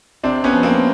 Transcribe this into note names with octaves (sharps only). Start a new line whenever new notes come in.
C3 C4 D4
B3 C#4
F3
A#3 C4